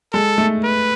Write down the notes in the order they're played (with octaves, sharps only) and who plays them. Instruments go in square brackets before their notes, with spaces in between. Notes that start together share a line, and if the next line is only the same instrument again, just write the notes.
[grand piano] G#3 [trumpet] A4
[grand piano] A3
[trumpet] B4